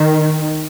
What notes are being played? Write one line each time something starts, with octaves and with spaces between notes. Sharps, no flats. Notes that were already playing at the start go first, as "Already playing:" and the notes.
Already playing: D#3